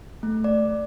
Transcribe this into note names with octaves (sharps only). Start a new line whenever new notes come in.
A3
D5